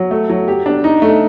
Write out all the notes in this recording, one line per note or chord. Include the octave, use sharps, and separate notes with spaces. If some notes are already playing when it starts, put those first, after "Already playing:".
Already playing: F#3
A3
F#3
G4
D4
D#4
A3